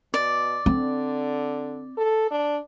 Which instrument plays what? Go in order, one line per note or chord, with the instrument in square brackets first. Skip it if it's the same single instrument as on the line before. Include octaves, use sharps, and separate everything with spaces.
[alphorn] B2 [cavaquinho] D5
[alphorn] D3 [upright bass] C4
[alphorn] A4
D4